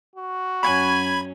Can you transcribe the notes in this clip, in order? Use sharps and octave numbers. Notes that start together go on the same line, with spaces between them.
F#4
F#2 F#3 C#4 G#5 B5 G#6